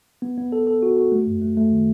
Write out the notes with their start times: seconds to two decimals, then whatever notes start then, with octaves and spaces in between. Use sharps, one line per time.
0.22 B3
0.37 B3
0.52 A4
0.67 A4
0.83 F#4
0.97 F#4
1.12 A3
1.27 F#2
1.42 A3
1.57 A3
1.72 D#3